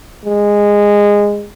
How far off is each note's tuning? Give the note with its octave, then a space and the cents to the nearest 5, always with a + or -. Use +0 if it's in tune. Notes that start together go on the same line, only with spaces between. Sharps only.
G#3 -15